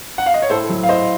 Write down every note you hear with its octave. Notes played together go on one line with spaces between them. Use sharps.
F#5
F5
D#5
C#5
A2 A4 C5
F#3
F5
A2 C5 D#5